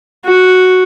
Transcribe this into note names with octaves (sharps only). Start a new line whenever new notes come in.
F#4